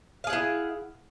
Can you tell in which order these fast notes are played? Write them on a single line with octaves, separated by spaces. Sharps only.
F5 G#4 F#5 E4